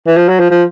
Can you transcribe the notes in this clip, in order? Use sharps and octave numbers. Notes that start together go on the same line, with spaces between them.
E3
F3
F#3
F3
F3